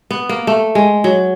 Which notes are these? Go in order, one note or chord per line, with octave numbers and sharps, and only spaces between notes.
B3
A#3
A3
G#3
F#3